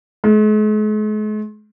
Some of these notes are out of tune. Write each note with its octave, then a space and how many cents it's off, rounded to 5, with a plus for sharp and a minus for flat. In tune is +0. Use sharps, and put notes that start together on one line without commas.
G#3 +45